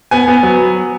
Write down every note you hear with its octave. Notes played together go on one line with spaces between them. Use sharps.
B3 G#5
B3
F#3